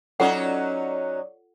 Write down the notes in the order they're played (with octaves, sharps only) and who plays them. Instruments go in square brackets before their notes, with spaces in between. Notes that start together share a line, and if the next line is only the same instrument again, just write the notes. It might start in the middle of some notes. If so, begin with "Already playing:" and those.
[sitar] F#3 C#4 D#4 [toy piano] F4 A4 F#5 [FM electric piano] C#5 D5